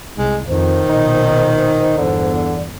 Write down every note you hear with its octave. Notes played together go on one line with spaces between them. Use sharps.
C2 G#3
F2 D#3 C5
A#1 B2 D#4
G1 E2 D3